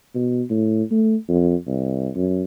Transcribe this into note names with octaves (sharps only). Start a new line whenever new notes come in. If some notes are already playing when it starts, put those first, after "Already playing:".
B2
A2
A3
F2
C2
F#2